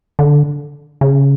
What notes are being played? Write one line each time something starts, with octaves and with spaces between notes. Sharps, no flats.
D3
C#3